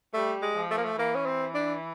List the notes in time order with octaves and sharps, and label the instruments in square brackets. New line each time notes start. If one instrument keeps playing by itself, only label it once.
[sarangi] G3 [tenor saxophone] A3
[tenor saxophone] G#3
[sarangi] F3
[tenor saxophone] A3
A#3
A3
[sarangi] E3 [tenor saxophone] A#3
[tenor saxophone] C#4
C4
D4